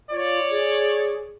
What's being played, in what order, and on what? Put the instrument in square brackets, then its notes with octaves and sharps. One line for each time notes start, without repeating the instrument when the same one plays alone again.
[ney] F4 [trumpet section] C#5 D5
[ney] G#4